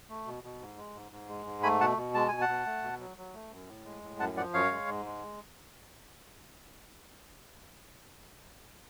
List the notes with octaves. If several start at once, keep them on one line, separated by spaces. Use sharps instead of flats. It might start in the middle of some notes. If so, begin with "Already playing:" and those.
A3
B2
B2
G#2
G#3
G#2
G#2
G#3
G#2
A3 G#5 B5
B2 F#5 A5
B2
G#3 A5
B2 G#5
F#5 A5
B2
A3
B2
F#3
F#3
A3
F#2
A2
G#3
A2
F#2 F#5 A5
F3 D5 F#5
F#2 C#5 F5
G#3
G#2
G#3